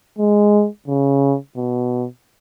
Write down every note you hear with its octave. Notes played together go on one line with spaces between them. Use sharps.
G#3
C#3
B2